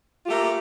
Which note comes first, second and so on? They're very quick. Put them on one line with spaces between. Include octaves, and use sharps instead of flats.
F4 G4 A3 A#3